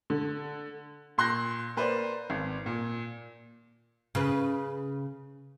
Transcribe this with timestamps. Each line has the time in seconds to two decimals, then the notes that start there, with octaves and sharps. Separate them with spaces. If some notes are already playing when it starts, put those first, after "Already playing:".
0.10 D3
1.18 A#2 C6 F#6 G6 A#6
1.77 A#3 B4 C5 D5
2.30 G#1
2.66 A#2
4.15 C#3 B4